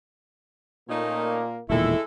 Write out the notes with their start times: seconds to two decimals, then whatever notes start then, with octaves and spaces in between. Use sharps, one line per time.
0.88 A#2 A3 A#3 C#4 D#4
1.70 E1 A#2 D#3 G#3 A3 E4 A4